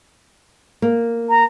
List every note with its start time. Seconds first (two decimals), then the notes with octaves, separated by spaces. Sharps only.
0.82 A#3
1.29 A#5